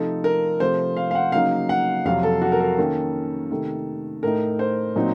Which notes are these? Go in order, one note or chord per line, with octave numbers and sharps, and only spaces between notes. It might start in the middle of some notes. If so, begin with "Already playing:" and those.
Already playing: C3 F3 A3 D#4 A4
A#4
C3 F3 A3 C5
F5
F5
F#5
C#3 F#3 A#3 D#4 F5
F#5
F2 C3 F#3 F5
A4
F#4
A#4
A4
D#3 A#3 C#4
C3 D#3 A3
A2 A3 D#4 A#4
C5
A#2 F#3 C4 D#4